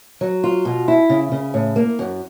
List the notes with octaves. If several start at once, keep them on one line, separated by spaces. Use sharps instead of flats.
F#3
F4
B2
E4
C#3
C#3
A2
A#3
F#2